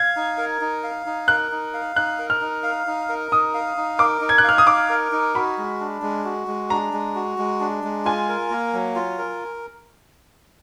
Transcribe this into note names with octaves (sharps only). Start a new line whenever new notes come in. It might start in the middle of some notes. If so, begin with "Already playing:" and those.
Already playing: F5 G#6
D#4
A#4
D#4
F5
D#4
A#4 F#6
D#4
F5
D#4 F#6
A#4
F6
D#4
F5
D#4
A#4
D#4 D#6
F5
D#4
A#4 D6
D#4
G#6
F#6
F5 F6
D#6
D#4 D6
A#4
D#4
F#4 B5
G#3
D4
G#3
F#4
G#3
D4 A#5
G#3
F#4
G#3
D4
G#3
F4 G#5
A#4
A#3
F#3
F4
A#4